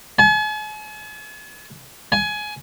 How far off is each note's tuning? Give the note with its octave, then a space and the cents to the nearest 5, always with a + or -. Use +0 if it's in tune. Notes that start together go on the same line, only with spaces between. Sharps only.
G#5 +45
G#5 +20